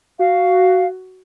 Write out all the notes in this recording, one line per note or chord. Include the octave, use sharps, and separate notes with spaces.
F#4 F5